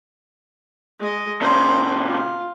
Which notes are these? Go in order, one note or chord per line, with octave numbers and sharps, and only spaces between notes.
G#3 D#5
A#2 C#3 C5
F4